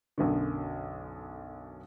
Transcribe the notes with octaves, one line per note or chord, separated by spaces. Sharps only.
B1 F#2 D3